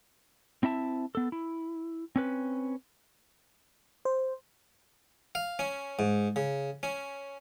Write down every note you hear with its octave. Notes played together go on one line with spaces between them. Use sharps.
C4 E4 E5 A5
B3 A4
E4
C4 C#4 B4
C5
F5
C#4
G#2
C#3
C#4